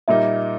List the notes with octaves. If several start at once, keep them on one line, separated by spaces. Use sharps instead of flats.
A#2 G3 A#3 D#4 E5